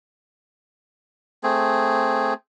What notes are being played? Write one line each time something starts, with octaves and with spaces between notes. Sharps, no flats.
A3 C4 G#4